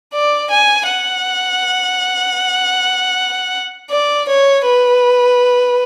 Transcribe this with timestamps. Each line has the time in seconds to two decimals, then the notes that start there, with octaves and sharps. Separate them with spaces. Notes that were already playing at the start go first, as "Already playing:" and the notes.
0.13 D5
0.51 G#5
0.88 F#5
3.91 D5
4.28 C#5
4.65 B4